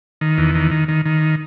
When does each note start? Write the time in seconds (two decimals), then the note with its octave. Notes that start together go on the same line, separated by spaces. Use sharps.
0.21 D#3
0.38 E2
0.55 D#3
0.71 D#3
0.88 D#3
1.05 D#3